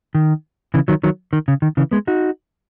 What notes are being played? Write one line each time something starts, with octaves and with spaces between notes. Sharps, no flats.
D#3
C#3 E3
D#3 F#3
D#3 F#3
D#3
C#3
D#3
C#3 E3
G#3 B3
D#4 F#4